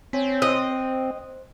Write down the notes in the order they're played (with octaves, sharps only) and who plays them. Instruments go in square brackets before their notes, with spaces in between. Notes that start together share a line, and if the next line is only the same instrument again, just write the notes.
[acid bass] C4 [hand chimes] C#5 G#5 B6
[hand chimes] C5 [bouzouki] D#5
[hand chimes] C5